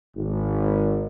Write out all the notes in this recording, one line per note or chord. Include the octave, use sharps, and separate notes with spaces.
G#1